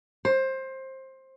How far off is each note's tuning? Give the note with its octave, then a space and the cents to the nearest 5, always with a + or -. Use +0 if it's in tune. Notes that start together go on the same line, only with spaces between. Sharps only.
C5 +20